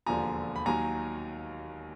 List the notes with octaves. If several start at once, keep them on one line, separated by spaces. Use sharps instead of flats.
E1 D#2 D3 F3 G#5 A#5
B5
D#2 D#3 F#3 G#5 A#5